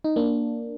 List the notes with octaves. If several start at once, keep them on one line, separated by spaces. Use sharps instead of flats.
D#4
A#3 D4